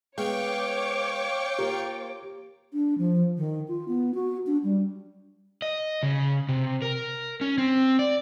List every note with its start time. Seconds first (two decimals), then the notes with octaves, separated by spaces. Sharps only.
0.18 G#3 B3 C#5 F5 G5 C#6 D6
1.59 A#3 F4 G4 A#4
2.73 D4
2.98 F3
3.37 D#3
3.68 F4
3.88 B3
4.14 F#4
4.47 D4
4.64 G3
5.62 D#5
6.03 C#3
6.49 C3
6.82 A#4
7.41 C#4
7.58 C4
7.99 D5